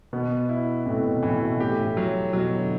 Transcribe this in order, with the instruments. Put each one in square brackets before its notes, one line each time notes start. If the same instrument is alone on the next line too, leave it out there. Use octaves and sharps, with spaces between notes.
[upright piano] B2 [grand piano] B3
[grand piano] E4
[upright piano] A2 [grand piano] C3
[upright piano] B2
[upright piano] A2 [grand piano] E3
[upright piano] B2
[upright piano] A2 [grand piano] G4
[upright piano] A2
[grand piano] F#3
[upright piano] B2 [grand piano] F#3
[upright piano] D3